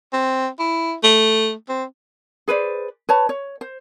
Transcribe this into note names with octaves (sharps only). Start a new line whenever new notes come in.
C4
E4
A3
C4
G#4 B4 C5 D5
B4 C#5 A5
C#5
C5